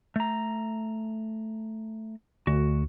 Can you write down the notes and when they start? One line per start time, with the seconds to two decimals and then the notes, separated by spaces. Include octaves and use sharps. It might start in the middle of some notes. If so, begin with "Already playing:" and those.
0.16 A3 A#5
2.47 D2 F#4